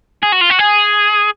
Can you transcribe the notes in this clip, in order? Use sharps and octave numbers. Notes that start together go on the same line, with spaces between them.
G#4
F#4
F4
F#4
G#4